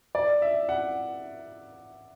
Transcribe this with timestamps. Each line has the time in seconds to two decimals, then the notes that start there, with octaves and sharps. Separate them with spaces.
0.15 D5
0.42 E5
0.69 F#5